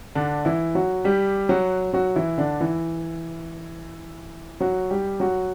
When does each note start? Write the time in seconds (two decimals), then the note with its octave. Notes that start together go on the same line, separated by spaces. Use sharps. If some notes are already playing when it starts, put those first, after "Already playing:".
0.15 D3 D4
0.45 E3 E4
0.75 F#3 F#4
1.04 G3 G4
1.49 F#3 F#4
1.93 F#3 F#4
2.16 E3 E4
2.38 D3 D4
2.60 E3 E4
4.60 F#3 F#4
4.90 G3 G4
5.20 F#3 F#4